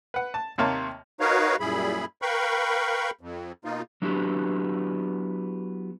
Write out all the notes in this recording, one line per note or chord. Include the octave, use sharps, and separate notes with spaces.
B4 F#5
A5
D#2 C3 A#3 C#5 A5
D#4 F#4 A#4 B4 C#5 F5
F#2 A#2 G3 E4 G#4 B5
A#4 B4 F5 G5 B5 C#6
F2
B2 A#3 D#4 F4
F#3 B3 D4 E4 F#4 G4